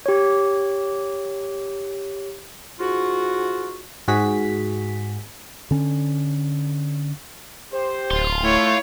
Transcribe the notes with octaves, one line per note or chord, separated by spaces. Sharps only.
G4 C#5
G#2 F4 F#4
G#2 F#4 G#4 B6
D3 C#4
G4 C5
D1 F5 C6
A3 E4 C#5